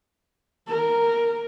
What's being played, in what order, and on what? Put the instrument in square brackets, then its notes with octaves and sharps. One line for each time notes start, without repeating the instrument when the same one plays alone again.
[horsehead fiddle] A#4